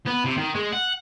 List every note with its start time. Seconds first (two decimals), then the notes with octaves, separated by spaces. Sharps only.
0.06 B3
0.25 C3
0.37 D#3
0.55 G#3
0.73 F#5